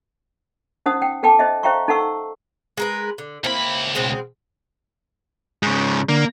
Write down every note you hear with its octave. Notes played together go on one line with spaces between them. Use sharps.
C#4 D#4 C5 F#5 D#6
F#5 G5
A4 B4 G5 A5 D6
C5 D#5 E5
C5 E5 F5 G5 A#5 C#6
D#4 A4 B4 F#5 C#6 E6
G#3 A#4 B4
D3
C#2 A#3 C4 E4 B5
B2 G#3 C4
G#2 C#3
D3 A#3